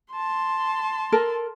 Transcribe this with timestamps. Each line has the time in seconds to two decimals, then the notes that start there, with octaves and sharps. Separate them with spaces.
0.13 A5 C6
1.12 A4 A#4